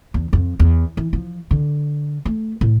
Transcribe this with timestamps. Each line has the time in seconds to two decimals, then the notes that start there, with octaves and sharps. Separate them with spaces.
0.14 E2
0.33 F2
0.60 E2
0.97 E3
1.13 F3
1.51 D3
2.25 A3
2.61 A2